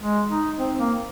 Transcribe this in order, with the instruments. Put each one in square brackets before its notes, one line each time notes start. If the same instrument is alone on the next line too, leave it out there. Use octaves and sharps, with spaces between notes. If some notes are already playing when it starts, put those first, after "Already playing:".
[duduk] G#3
D#4
C4
A#3